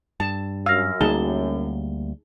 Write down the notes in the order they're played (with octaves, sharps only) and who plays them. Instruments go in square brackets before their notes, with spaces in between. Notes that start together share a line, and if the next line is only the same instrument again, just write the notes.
[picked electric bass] G2 [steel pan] A5
[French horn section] F#2 [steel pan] F5 [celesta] E6 F6 A#6
[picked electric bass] D2 G3 A#3 [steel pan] D#4 G#4 A5 [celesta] G7